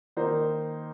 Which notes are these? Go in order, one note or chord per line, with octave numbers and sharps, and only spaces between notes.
D#3 A#3 D#4 C5